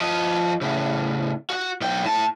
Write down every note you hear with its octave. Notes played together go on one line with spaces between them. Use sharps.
F3 D#5
A2 C#3
F#4 F#5
B1 G5
A2 A5